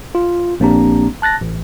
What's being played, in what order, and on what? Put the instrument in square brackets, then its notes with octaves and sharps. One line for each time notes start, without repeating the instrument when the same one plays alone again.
[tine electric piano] F4
A#1 A#3 C4 D4 G4 A#5
A5 F#6 A6 A#6
A1